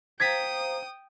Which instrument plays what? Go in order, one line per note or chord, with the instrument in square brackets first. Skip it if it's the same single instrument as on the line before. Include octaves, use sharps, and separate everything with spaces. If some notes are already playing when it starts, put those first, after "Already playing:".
[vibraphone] C5 F5 A#5 [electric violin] G5 D#6 [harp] G#6 A6 B6